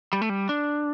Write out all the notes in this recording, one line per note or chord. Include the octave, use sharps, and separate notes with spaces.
G3
A3
G3
D4